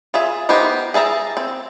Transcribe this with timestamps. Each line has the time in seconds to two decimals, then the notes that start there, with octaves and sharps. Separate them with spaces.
0.14 F4 G#4 E5
0.49 B3 D#4 G4 A#4 C5
0.94 G#4 E5 A5 A#5
1.37 C4